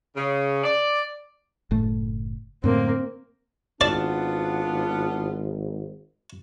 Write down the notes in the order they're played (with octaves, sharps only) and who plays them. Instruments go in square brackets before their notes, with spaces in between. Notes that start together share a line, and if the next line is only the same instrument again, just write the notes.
[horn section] C#3
D5
[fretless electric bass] F#1 A2 A3
[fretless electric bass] F#2 A2 D3 [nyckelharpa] A#3 C4
[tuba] G#1 [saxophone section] B3 F4 [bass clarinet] D4 [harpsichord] D5 A5